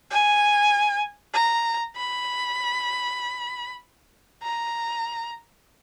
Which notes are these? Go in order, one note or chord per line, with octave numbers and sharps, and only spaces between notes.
G#5
A#5
B5
A#5